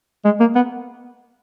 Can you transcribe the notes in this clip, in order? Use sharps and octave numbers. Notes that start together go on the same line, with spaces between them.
G#3
A#3
B3